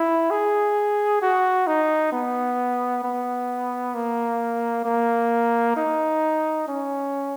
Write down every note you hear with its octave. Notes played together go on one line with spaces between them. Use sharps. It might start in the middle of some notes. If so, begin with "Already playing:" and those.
Already playing: E4
G#4
F#4
D#4
B3
B3
A#3
A#3
D#4
C#4